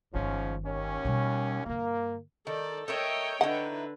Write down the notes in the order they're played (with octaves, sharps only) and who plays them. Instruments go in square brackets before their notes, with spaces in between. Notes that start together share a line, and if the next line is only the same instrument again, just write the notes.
[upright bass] G1 D#3 [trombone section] G#2 F3 C#4
[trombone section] D#2 C#4
[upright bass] B2 G3
[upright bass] G2 D3 [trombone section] A#3
[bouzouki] D#3 [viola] A4 D5
[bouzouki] A4 A#4 E5 [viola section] C#5 G5 [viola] D#5
[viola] D3 B4 [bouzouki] D#4 E4 [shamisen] F#5